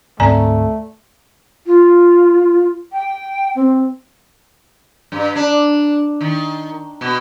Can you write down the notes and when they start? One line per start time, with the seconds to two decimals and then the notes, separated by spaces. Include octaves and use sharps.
0.20 D2 G#2 A3 C4 D5 G#5 A#5
1.67 F4
2.93 G5
3.56 C4
5.12 G2
5.36 D4
6.21 D#3
7.01 B2